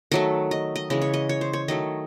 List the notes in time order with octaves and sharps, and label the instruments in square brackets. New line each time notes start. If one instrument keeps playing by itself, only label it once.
[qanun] D#3 F#3 A3 D#5
D#5
D#5
C#3 E3 G#3 D#5
C#5
D#5
C#5
C5
C#5
D#3 F#3 A3 D#5